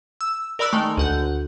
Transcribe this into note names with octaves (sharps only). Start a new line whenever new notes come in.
E6
A#4 D5 B5 E6 F#6
D#3 G#3 A3
D2 F#5 G6